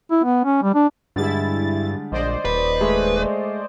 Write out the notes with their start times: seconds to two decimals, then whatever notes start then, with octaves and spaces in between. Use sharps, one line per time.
0.11 E4
0.24 B3
0.45 C#4
0.63 G3
0.75 D4
1.16 G2 D3 G3 G#3 E4 A6
2.12 A#1 C5 D5 D#5
2.45 D#1 B4
2.80 G#3 A3